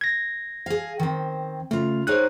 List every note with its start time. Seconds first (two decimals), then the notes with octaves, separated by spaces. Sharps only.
0.01 G#6 A#6
0.66 G#4 F5
0.99 D#3 C4
1.71 C#3 A3 F4
2.07 D#4 G#4 A#4 C5 C#5 F#6